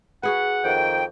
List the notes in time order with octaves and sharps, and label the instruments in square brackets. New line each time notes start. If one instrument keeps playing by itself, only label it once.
[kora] F#4 G#4 B4 [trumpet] F#5
[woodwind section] F2 D#3 G5